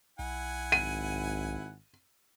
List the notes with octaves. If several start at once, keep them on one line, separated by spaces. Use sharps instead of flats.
B1 E4 F#5 G#5
G#1 D#7